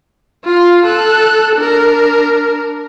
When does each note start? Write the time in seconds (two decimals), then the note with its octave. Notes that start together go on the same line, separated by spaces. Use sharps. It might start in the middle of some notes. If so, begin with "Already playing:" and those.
0.44 F4 F5
0.85 A4 F#6
1.56 D4 A#4